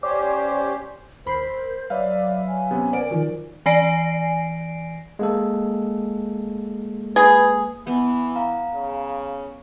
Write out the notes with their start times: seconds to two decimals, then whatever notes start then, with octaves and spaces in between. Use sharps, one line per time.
0.03 C#4 G4 C5 D5
1.26 D#2 A#4 C5 B5 C6
1.90 F#3 B4 D5 E5 F5
2.48 G#5
2.71 C3 B3 C#4
2.93 B3 C4 A#4 D5 D7
3.11 D#3 F3 F#3
3.66 E3 D5 G#5 A#6 C7 D7
5.19 G#3 A#3 A4
7.16 G#4 B4
7.87 E3 B3
8.36 F5 A#5
8.73 C#3